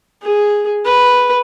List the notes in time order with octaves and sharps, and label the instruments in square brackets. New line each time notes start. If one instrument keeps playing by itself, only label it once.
[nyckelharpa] G#4
B4